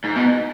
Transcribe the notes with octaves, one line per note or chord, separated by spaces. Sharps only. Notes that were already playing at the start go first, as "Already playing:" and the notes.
G#2
B2